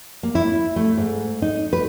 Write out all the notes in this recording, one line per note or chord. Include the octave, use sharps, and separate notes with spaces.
A#3
E4
A3
G#2
D#4
B4